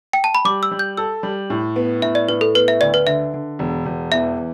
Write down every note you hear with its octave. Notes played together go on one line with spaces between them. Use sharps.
G5
A5
B5
G3 D6
E6
G3
G6
A4 E6
G3
A2
B3
A2 E5
D5
A2 B4
A4
B3 B4
E5
D2 D5
B4
D3 E5
D3
E1
E1
E2 E5